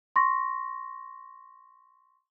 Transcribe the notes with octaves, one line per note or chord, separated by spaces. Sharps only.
C6 C#6 A#6